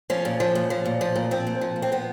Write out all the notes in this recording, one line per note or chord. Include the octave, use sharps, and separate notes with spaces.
F3 C#4
A#2
F3
A#2
F3
A#2
F3
A#2
F3 C4
A#2
F3
A#2
C4
F3 B3